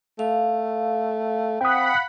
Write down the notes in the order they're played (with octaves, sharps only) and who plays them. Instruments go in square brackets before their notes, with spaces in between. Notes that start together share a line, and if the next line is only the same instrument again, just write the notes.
[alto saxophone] A3 [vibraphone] F5
[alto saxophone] C4 [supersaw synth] F#5 B5 [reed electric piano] G5 D#6